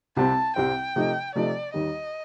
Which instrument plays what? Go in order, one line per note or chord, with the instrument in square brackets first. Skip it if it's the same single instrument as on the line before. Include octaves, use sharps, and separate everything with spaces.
[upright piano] C2 C3 G3 C4 [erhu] A5
[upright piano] C2 C3 G3 C4 [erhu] G5
[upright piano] C3 F3 A3 D#4
[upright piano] C3 F3 A3 D#4 [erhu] D5
[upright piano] D#2 D#3 G3 [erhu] D#5